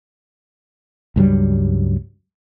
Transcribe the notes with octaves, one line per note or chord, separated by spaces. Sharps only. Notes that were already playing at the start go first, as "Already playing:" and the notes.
C#2 G2 F#3 G3